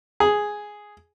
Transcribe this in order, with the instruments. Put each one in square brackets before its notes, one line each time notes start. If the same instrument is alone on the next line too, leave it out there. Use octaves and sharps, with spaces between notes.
[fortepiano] G#4